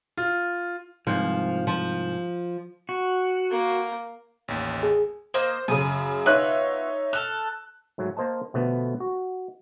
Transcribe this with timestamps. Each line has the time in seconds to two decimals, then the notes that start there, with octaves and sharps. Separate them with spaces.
0.17 F4
1.07 C2 G#2 F3
1.67 F3
2.89 F#4
3.51 A#3
4.48 A1 D#2
4.83 G#4
5.34 A#3 C5 D#5
5.68 F#2 C#3 D#6
6.26 B3 D#4 F4 C#5 E5 F#6
7.13 A4 F6 F#6
7.98 G#2 F#3 A3
8.17 A#3 C5 D#5 A5
8.54 B2 D3 F3 A3 B3
9.00 F#4